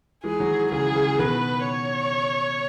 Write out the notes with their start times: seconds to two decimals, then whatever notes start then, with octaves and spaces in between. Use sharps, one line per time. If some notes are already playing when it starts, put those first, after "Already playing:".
0.24 E3 G#3 G#4
0.40 D#3 F#3
0.72 C#3 E3 G#4
0.96 C#3
1.19 B2 D#3 B4
1.67 C#5